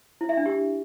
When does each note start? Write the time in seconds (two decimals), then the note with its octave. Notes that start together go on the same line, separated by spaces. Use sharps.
0.21 E4
0.29 E5
0.37 D4
0.46 G4